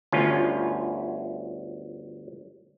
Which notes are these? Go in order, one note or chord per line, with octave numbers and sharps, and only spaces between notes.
G1 D2 C#4 F4